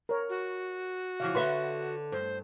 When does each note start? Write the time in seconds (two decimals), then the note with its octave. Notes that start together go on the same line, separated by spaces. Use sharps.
0.09 A#4 C#5
0.30 F#4
1.20 C#3 E3 F3 F5
1.35 D3 B4 C#5 E5 C6
2.12 G2 A4 C5